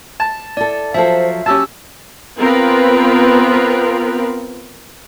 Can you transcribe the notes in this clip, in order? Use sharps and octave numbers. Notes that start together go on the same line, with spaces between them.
A5
E4 A4 D5
F3 F#3 A4 C5 E5 F5
F#3 C#4 G4 A5 E6
B3 C4 F4 A#4 B4